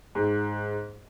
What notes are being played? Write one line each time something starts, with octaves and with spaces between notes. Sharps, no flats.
G#2